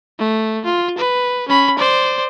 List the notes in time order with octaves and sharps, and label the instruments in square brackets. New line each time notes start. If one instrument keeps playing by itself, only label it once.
[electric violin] A3
F4
B4
C#4 B5
C5 D5